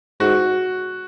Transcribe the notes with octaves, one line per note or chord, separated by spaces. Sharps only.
G#2 F#4